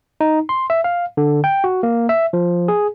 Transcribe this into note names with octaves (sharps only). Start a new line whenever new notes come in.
D#4
C6
E5
F5
D3
G5
F#4
A#3
E5
F3
G#4